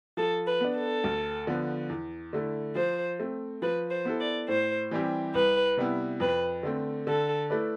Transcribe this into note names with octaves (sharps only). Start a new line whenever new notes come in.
F3 A4
B4
B3 D4
A4
D2
D3 F3 B3
E2
D3 A3 E4
F3 C5
A3 C4
F3 B4
C5
B3 E4 A4
D5
A2 C5
E3 G3 C4 G4
C2 B4
C3 G3 B3 E4
F2 B4
D3 A3 C4
D3 A4
A3 E4 B4 D5